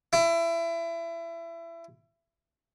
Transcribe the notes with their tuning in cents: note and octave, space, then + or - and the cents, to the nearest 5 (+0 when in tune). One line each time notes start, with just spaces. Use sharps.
E4 +25